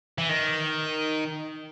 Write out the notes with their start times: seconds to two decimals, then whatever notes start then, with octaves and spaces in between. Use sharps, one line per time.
0.18 E3
0.29 D#3